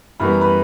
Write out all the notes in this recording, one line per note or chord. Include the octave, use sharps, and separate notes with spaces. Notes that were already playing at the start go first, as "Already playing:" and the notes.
F#2 E3 G3 B3 B5
A#5
B4 B5